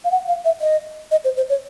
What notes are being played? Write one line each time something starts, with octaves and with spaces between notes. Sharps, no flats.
F5
F#5
F5
E5
D#5
D#5
C5
C5
C#5